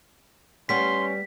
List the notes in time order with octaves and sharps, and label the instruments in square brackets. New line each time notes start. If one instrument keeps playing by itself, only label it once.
[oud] G3 B3 [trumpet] C#4 [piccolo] C6 [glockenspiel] B6